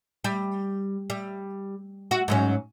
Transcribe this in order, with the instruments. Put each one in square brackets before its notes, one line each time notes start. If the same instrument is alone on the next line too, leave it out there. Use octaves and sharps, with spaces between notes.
[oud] G3
G3
F#4
G#2 F#3 C#4